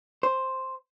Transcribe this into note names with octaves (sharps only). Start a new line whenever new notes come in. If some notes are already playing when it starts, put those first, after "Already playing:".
C5